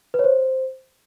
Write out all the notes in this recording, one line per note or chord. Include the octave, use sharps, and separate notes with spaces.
B4
C#5
C5